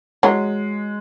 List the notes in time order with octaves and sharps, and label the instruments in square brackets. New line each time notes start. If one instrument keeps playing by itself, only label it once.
[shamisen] F#3 [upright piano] G#3